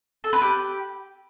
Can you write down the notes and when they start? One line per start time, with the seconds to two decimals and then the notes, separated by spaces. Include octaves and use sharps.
0.24 A4
0.33 B4
0.42 G4